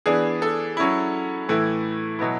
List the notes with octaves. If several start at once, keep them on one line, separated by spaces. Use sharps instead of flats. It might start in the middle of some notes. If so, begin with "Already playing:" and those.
E3 B3 D4 G#4
A4
F#3 C#4 E4
A2 E3 A3 E4
B2 F#3 B3 E4